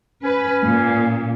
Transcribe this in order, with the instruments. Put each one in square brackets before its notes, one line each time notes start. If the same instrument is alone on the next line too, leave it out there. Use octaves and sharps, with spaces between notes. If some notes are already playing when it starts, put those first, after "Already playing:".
[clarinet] C#4 [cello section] B4
[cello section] A#2